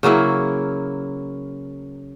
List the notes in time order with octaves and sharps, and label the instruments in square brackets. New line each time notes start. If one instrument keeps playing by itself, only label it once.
[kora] C#3 F#3 A#3 E4